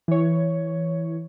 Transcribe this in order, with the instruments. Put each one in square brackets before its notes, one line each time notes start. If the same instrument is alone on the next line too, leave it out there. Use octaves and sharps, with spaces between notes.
[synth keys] E3 C#5